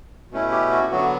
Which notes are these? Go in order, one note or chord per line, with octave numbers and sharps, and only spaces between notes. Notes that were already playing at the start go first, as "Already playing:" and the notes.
B2 A3 C#4 E4
G4
F#4
D3 F#3 B3 F#4